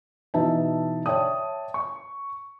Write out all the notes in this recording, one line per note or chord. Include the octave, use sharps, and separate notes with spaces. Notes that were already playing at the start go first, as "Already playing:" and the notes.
B2 E3 D#4 B4 E5 A5
C#5 D5 E5 G5 A5 D#6
C#6